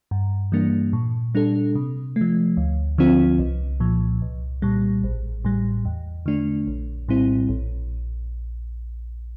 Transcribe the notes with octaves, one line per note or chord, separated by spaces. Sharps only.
G2
E3 G3 A#3 D4
A#2
G3 D4 A4
C3
A3
F3
D2
D3 F3 C4 F4
C2
A#2 F3
C2
A#2 G3
A1
A2 G3
E2
D3 A3 D4
A#1
A2 G3 C4 E4
A#1